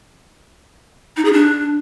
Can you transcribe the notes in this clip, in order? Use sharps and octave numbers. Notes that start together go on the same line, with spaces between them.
D#4
G#4
D4